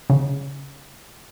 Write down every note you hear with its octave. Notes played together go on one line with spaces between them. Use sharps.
C#3